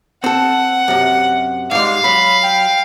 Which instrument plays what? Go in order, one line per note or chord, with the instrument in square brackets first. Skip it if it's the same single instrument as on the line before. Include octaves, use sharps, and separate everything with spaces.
[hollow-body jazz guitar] C4 A4 [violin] F#5
[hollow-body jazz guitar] F#2 C3
[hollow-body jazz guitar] G#2 G3 [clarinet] G#3 [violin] F5
[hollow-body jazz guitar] F#3 [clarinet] B5
[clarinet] G5